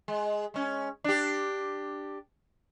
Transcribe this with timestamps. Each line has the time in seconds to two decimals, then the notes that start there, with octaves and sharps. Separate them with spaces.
0.08 G#3
0.54 G#3 C#4
1.04 D4 G4